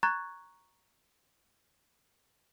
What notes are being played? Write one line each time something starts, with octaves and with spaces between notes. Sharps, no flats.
A#5 C#6 F#6 G#6 A6